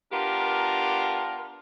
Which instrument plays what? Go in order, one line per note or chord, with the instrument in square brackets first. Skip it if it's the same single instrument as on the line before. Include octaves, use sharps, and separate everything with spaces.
[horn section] B3 D4 F4 G4 A#4